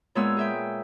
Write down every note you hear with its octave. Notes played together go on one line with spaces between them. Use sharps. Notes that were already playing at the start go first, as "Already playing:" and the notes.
A#2 G#3 B3 C#5 E6
G#4 E5 G5